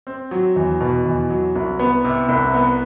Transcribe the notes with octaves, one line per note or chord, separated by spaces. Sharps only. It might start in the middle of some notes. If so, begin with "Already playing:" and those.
C4
F#3
E2
B2
E2
F#3
C2
B3
C3
C2
B3